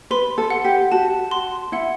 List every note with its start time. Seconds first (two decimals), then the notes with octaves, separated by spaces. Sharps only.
0.11 B4 C6
0.38 A4
0.50 F#5
0.64 G4
0.92 F#4 A5
1.31 C6
1.72 E4 F#5